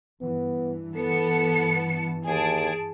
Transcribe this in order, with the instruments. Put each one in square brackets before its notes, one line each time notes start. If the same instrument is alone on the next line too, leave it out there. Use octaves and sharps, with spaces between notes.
[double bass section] G2 E3 [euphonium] B3
[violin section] B3 A5 C#7 [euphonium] A4
[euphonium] D#2 [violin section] G#4 A5 D7